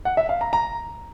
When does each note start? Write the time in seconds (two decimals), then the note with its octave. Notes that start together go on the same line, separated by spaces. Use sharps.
0.05 F#5
0.17 E5
0.29 F5
0.41 A#5
0.53 A#5